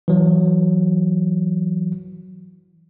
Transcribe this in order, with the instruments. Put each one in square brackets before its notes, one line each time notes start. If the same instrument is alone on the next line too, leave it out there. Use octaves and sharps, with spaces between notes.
[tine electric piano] E3 F#3